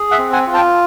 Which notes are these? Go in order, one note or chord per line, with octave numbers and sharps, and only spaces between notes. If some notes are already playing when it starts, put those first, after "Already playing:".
Already playing: G#4
E5 F#5
C4
F#5 G#5
F4
G5 A5